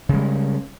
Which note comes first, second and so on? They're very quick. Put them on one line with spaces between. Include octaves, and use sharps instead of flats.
C#3 G#3 G3